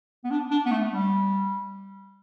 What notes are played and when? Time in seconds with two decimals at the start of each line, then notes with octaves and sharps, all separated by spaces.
0.24 B3
0.31 D4
0.51 D4
0.66 B3
0.71 A3
0.91 G3